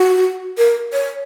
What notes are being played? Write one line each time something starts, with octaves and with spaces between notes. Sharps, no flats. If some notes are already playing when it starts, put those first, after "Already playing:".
Already playing: F#4
A#4
C#5